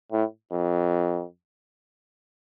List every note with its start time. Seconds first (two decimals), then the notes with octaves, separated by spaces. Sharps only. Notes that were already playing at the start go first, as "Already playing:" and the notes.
0.12 A2
0.52 F2